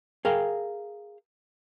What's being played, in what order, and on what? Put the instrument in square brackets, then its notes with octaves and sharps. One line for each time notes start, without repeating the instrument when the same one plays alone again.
[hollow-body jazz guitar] G#4 A#4 F5 G5